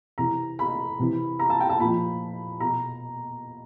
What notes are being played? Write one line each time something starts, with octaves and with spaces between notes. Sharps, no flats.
C3 E3 A#5
B5
C3 E3
A#5
A5
G5
A5
A#2 F3 B5
B2 A#5